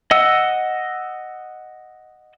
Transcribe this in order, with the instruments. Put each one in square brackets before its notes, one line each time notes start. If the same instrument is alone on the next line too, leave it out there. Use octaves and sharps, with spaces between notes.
[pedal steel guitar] D#5 F#5 E6